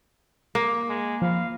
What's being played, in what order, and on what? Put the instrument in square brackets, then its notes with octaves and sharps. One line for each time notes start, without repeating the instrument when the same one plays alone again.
[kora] A#3
[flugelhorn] G#3
[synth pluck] F3 B5 [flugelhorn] F5